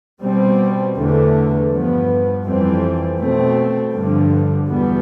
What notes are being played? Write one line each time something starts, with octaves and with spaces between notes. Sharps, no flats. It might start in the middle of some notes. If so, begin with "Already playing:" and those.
B2 G3 C4
E2 D3 A3
G2 F3 B3
F2 E3 G3 C4
B2 A3 C4
G2 D3 F3
E2 B2 G3 B3